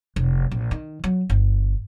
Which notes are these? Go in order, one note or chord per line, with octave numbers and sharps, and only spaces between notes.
F1
A#1
D#3
F#3
G1